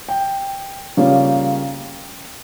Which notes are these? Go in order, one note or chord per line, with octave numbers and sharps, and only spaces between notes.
G5
C#3 G3 A#3 C#4 F4